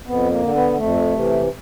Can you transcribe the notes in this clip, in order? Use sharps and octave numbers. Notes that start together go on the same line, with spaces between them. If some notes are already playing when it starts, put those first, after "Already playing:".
F2 B3
A#3
D3
B3
F2 A3
C3 E3